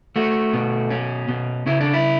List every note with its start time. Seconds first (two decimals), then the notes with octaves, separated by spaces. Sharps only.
0.16 A3 F#4
0.54 B2
0.91 C#4
1.28 B2
1.66 C#3 E4
1.81 D4
1.94 E4